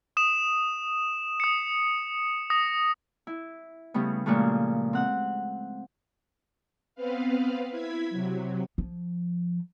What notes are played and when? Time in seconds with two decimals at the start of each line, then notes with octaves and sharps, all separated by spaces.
0.17 D#6 E7
1.40 D#6 C#7
2.50 D#6 A#6
3.27 E4
3.94 C#3 G3 A3 B3
4.26 A#2 C#3 F3 G#3 A3
4.93 C4 F#5 F#6
6.95 B3 C4 B4 F5
7.72 E4 G#6 B6
8.10 C3 F#3
8.78 F3